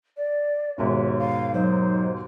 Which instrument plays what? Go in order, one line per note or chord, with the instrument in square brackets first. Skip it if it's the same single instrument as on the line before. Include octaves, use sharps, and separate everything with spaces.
[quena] D5
[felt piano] D#2 G#2 B2 [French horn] C#5 [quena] E5
[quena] F5
[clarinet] F#3 [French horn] D#4 [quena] C5